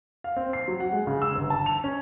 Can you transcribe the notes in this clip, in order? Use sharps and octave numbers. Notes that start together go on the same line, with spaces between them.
F5
C4
C7
F#3
F#5
G#3
C#3
E6
G1
A5
F7
C#4